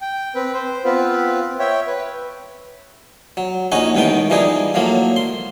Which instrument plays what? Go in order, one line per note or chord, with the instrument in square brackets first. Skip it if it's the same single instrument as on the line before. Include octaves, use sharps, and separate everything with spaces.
[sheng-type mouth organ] G5
C4 B4
C5
B3 C4 F4 B4
C#5 E5 G5
B4
[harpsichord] F#3
A#1 C#4 D#4 F#4 G#5
A1 A2 D#3 B3 G5
E3 F3 G3 D#4 G#4
A2 F3 F#3 A#3
C6